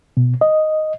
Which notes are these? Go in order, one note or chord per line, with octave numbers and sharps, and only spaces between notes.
B2
D#5